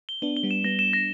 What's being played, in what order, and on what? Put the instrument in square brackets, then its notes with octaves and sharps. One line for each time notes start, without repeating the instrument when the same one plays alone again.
[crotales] G7
[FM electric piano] B3 D4 [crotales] G7
[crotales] G7
[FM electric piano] G3 B3
[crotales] E7
[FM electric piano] G3 B3 [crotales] A#6
[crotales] E7
A#6